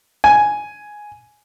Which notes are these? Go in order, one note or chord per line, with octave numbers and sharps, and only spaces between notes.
G#5